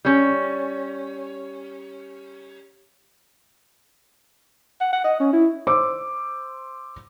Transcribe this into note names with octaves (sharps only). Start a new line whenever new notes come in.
G3 C#4
F#5
F#5
D#5
C#4
E4
C5 D6 E6